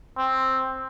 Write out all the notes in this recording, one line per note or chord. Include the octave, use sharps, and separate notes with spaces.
C4